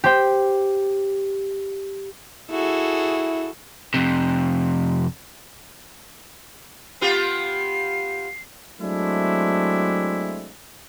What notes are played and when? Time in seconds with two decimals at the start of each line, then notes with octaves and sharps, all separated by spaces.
0.04 G4 C5 G5
2.51 E4 F#4 G#4 A4
3.94 F2 C3
7.01 B3 F4 G4 C7
8.81 F#3 G#3 A3 C4 D4 E4